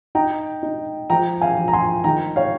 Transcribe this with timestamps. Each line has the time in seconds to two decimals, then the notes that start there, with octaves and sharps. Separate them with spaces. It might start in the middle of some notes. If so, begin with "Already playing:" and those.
0.15 D#4 G5 A#5
0.63 D#4
1.10 F3 G5 A#5
1.41 F5 G#5
1.57 F3
1.68 A#5
1.73 G#5 C6
2.04 D#3 G5 A#5
2.36 C#5 F5